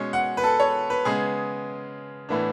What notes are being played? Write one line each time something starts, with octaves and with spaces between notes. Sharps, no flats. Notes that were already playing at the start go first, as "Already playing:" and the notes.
Already playing: B2 G#3 C#4 G#5
F#5
B4
A4
C#5
B4
C#3 G#3 B3 G#4
A2 E3 B3 D4